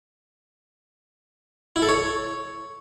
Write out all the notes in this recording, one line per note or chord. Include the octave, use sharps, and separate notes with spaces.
E4
A4
C#5